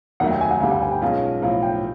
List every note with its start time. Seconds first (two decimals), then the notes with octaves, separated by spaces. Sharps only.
0.20 F1 D#2 D#3 F#3 A3 F#5
0.31 G5
0.41 G#5
0.51 F#5
0.60 D2 D3 G3 F5
0.71 F#5
0.82 G#5
0.92 G5
1.02 B1 B2 G#3 C#4 F4 F5
1.42 B1 A2 F3 F5
1.63 G5